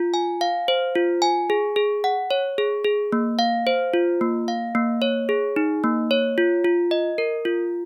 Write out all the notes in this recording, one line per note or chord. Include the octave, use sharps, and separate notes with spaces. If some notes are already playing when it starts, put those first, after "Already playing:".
Already playing: F4
G#5
F5
C5
F4
G#5
G#4
G#4
F#5
C#5
G#4
G#4
A#3
F5
C5
F4
A#3
F5
A#3
C#5
G#4
D#4
A#3
C#5
F4
F4
D#5
A#4
F4